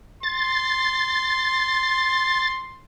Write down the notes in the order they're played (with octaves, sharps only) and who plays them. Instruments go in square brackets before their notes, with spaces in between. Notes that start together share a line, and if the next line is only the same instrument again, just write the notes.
[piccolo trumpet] C6 [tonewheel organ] A6